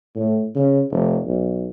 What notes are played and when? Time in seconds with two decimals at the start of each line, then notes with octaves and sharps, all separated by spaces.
0.15 A2
0.55 C#3
0.91 F1
1.26 B1